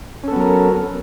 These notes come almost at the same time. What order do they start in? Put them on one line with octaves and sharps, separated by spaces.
C#4 A4 B3 F#3 A#4